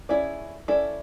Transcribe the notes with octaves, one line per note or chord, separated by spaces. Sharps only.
C#4 E4 G#4 D5
C#4 E4 A4 D5